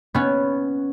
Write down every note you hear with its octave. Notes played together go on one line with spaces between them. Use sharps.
B3 C#4